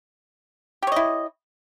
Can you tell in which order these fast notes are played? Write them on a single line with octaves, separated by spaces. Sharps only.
G4 C#5 D#5 E4